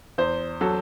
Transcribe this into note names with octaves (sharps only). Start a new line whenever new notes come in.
E2 C5
F#3 A4